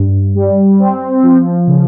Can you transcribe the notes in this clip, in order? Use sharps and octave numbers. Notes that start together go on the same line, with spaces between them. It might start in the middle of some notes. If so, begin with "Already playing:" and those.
Already playing: G2
G3
C4
F3
C#3